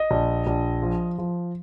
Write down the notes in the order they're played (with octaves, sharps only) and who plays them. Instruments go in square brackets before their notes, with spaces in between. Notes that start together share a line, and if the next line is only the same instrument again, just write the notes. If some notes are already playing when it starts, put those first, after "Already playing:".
Already playing: [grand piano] D#5
A#1
A#1
F3
F3